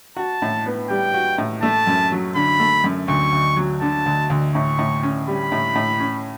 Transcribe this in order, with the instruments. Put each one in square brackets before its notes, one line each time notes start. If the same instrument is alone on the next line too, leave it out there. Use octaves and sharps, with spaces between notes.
[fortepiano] F#4 [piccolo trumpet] A5
[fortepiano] A2
B3
[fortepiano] G3 [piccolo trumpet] G5
[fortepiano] F#4
A2
[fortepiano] A3 [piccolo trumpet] A5
[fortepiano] F#2
F#3
[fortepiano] D3 [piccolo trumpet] B5
[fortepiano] A3
F#2
[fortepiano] D2 [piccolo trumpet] C#6
[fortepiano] D2
F#3
[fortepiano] D3 [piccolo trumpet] A5
[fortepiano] D2
D2
[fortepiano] A2 [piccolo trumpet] C#6
[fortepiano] A2
C#4
[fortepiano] G3 [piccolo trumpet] B5
[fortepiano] A2
A2
C#4